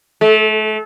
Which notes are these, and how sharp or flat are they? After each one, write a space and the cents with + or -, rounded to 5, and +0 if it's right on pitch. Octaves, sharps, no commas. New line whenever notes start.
A3 -30